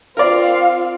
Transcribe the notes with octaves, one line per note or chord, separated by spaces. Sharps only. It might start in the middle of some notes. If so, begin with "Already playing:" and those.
C4 F4 A#4 D5 F5